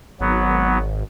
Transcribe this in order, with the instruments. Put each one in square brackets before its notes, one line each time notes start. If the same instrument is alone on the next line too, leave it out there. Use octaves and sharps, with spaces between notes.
[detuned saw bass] G#1 [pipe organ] F#3 B3